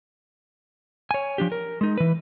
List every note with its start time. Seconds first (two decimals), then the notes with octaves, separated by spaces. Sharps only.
1.11 C#5 G#5
1.38 F3 D4 G4
1.52 A#4
1.81 G#3 D#4
1.98 E3 B4